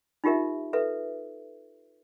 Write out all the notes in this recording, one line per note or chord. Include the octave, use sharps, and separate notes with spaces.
D#4 F4 G4 A#4 E5
A4 B4 E5